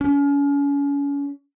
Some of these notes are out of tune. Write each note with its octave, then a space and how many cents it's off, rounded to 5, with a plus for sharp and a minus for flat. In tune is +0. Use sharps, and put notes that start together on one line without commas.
C#4 +35